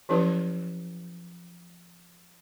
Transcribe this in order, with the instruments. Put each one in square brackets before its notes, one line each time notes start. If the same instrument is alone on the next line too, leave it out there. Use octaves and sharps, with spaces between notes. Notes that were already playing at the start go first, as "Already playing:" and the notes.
[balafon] F3 F#3 C#4 E4 G4 B4